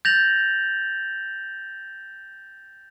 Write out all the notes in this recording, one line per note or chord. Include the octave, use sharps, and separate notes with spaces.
G6 A6 A#6 F7 F#7